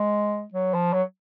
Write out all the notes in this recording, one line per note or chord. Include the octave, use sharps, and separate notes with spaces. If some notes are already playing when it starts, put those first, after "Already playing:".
Already playing: G#3
F#3
F3
F#3